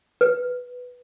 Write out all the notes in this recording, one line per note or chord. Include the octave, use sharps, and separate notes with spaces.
B4